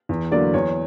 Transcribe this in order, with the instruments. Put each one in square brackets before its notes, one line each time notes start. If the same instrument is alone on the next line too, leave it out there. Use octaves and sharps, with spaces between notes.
[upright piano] E2
D3 F#3 A#3 D5
E2 C#5